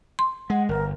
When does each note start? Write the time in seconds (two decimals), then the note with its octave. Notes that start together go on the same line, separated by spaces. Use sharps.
0.19 C6
0.50 G#3 F#5
0.69 G1 A#4